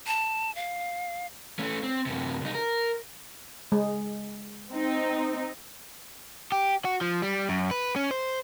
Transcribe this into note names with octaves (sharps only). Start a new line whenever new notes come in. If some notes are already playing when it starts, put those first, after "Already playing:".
A5
F5
A3 C#4
C4
F#2 C3
C2 D#4
A#4
G#3
C4 D#4
G4
F#4
F3
G3
F#2
B4
C#4
C5